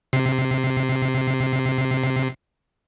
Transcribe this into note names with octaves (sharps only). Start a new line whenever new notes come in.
C3 C7